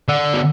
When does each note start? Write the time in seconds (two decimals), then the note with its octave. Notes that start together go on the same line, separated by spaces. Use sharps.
0.08 D3
0.33 B2